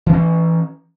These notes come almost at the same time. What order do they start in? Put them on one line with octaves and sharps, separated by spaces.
E3 D4 C#4